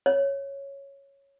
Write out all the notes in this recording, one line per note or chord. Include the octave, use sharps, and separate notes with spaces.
C#5